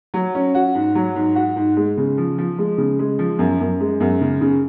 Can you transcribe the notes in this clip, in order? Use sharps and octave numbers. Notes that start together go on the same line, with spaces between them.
F#3
C#4
F#4
G#2
F#3
G#2
F#4
G#2
G#3
C#3
F3
F3
G#3
C#3
G#3
F3
F#2
F#2
G#3
F#2
C#3
C#3